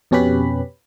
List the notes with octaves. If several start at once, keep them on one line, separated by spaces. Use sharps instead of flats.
F2 B2 C#4 G4 B4 B5